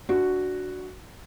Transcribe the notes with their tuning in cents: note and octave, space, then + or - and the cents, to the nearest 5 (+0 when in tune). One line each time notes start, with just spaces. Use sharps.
D4 +0 F#4 +0